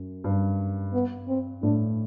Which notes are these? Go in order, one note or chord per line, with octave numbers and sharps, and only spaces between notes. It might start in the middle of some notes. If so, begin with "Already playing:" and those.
Already playing: F#2
G2
B3
C4
A2 D4